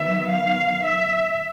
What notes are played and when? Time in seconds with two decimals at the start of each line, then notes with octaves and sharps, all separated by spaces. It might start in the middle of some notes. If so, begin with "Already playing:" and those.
Already playing: D#3 F#3 B3 E5
0.30 F5
0.84 E5